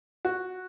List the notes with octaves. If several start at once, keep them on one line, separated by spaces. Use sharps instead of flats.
F#4